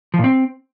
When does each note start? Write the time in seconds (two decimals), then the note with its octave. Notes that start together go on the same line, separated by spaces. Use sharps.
0.14 F3
0.19 A#2
0.24 C4